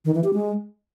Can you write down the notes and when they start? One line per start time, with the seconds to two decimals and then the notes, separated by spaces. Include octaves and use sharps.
0.05 D#3
0.14 E3
0.24 G4
0.34 G#3